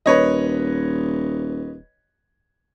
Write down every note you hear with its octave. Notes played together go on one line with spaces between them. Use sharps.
D#1 B4 C#5 D#5